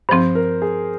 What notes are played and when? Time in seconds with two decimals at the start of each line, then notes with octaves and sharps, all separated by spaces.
0.09 G2 F3 C4 C5
0.35 A#4
0.62 G#4